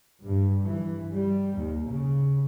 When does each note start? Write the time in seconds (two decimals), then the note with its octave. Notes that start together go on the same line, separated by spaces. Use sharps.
0.24 G2
0.66 E3
1.12 G3
1.58 D#2
1.89 C#3